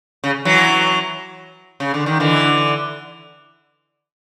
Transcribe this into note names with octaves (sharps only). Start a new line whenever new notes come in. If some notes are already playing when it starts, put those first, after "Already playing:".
C#3
E3 F#3
C#3
D3
D#3
D3 E3